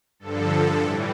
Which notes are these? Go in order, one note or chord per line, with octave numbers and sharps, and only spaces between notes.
G2 D3 F3 A4
A2 E3 G3 A4